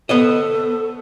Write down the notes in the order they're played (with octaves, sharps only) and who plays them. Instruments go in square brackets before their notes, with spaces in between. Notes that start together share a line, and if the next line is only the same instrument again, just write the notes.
[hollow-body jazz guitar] B3 C5 D#5 [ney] A4